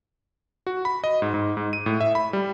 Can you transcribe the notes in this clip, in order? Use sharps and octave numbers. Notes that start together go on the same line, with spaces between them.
F#4
B5
D#5
G#2
G#2
G#2
D#7
A2
E5
B5
G3